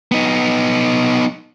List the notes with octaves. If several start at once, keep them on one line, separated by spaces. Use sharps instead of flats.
B3 D#4